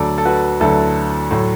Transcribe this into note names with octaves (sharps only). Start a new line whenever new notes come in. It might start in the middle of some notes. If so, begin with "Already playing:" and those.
Already playing: D2 D3 F#3 A4 D5
A4
F#4 B4
D2 D3 F#3 E4 A4
A2 F#3